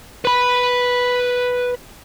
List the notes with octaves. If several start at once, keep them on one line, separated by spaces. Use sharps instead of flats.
B4 B5